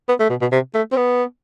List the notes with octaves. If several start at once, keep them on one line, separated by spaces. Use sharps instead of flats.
B3
A3
B2
B2
C3
A3
C4
B3